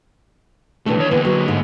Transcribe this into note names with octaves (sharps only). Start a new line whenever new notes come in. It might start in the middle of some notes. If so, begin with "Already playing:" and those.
B2 E3 A3 D4 A4
D#2 C#5
D3 E3 A#3 B3
F#3
G#2 A3